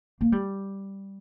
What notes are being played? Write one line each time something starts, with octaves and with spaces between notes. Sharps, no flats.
A#3
G3